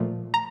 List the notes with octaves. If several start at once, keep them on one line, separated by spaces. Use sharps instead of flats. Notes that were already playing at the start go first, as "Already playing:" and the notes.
Already playing: A#2 F3 A3
A#5